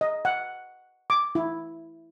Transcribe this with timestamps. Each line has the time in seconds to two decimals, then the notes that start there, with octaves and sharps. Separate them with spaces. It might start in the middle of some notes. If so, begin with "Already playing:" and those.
0.01 D#5
0.25 F#5
1.10 D6
1.35 E4